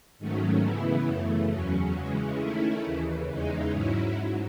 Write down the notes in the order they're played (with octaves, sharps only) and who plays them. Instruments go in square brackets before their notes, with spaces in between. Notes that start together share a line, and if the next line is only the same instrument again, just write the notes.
[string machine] G#2 D#3 F#3 A3 C#4
C#3 E3 B3 E4
F#2 C#3 E3 A3
E2 C#3 F#3 C#4
C#3 E3 G#3 C#4
D#3 A3 C#4 E4
D#2 C#3 E3
E2 C#3 E3 G#3 D#4
G#2 F#3 C#4 E4
G#2 F#3